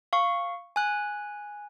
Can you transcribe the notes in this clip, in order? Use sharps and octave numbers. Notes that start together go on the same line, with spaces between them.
F5 C#6
G#5 F#6